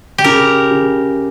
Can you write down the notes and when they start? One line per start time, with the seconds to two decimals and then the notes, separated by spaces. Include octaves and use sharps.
0.18 G4
0.24 C#3 A#4
0.71 C#3